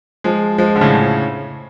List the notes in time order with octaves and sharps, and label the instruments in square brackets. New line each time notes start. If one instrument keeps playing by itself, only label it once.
[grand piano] F3 G#3
F3 G#3
D3
A2 C#3